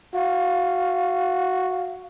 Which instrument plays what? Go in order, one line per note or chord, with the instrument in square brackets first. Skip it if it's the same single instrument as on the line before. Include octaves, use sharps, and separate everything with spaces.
[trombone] F#4 [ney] F5